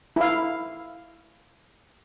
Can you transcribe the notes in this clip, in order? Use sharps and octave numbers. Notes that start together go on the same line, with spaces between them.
E4 F5